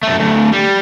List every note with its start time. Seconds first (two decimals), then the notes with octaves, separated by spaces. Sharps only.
0.03 F#2 A3
0.20 D2 A2
0.53 G3